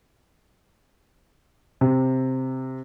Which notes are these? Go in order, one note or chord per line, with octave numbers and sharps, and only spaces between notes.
C3